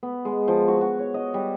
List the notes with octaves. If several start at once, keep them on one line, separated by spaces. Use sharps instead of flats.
B3
G#3
F3
F#4
F#4
C#5
D#5
G3